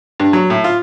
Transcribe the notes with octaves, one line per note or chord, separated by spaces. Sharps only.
G2
F#3
A2
F4